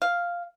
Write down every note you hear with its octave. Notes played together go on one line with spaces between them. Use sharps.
F5